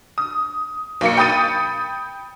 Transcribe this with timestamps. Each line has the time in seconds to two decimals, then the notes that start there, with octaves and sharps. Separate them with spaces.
0.18 D#6
1.01 B1 A#3 C#7
1.17 G5 B5 D#6 A6 D#7